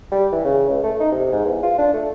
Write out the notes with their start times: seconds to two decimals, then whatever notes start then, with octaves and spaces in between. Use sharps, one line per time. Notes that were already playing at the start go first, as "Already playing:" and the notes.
0.12 G3
0.32 E3
0.45 C#3
0.70 C#2
0.83 A3
1.00 D#4
1.12 C3
1.32 G#2
1.45 E2
1.63 F4
1.78 D4
1.94 A3